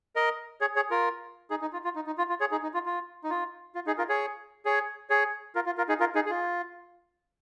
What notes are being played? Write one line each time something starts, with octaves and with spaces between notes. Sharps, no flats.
A#4 D#5
G#4 C#5
G#4 C#5
F4 A#4
D#4 G#4
D#4
F4
F4
D#4
D#4
F4
F4
G#4 C#5
D#4 G#4
D#4
F4
F4
D#4
F4
F4
D#4 G#4
F4 A#4
G#4 C#5
G#4 C#5
G#4 C#5
F4 A#4
F4
F4 A#4
D#4 G#4
F4 A#4
D#4 G#4
G#4
F4